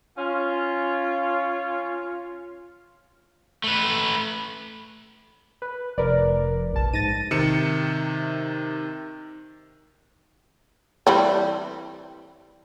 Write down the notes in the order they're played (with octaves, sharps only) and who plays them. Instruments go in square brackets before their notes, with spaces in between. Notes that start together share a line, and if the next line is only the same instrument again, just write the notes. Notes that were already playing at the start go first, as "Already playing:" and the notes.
[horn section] C#4 F4
[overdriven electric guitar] A3 B4
[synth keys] B4
[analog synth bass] F1 [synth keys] A#4 B4 D5
[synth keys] A#1 A5
[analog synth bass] G#2 [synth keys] A6 A#6 D#7
[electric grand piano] C3 D#3 C#7 E7
[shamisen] E3 G3 C4